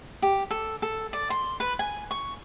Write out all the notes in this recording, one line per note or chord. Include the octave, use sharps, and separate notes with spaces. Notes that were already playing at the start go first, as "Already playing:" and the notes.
G4
A4
A4
D5
C6
B4
G#5
C#6